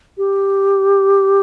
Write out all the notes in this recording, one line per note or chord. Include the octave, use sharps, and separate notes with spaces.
G4